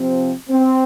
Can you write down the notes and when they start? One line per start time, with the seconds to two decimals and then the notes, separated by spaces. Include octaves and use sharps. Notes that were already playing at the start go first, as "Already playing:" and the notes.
Already playing: C3 F3 C4
0.49 C4